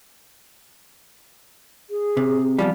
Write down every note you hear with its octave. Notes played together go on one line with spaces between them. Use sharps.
G#4
C3
E2 F3 G3